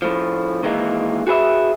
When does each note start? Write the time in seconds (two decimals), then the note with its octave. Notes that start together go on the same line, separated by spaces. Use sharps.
0.02 A2 F3
0.63 D#3 E3 G#3 A#3
1.27 F#4 G#4 B4 E5